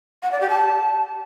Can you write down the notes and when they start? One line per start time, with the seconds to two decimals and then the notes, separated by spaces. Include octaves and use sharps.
0.23 F#5
0.32 D5
0.41 G4
0.49 A5